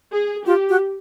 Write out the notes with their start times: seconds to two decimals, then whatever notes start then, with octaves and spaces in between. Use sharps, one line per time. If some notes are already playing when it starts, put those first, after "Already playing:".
0.11 G#4
0.46 F4 G4
0.69 F#4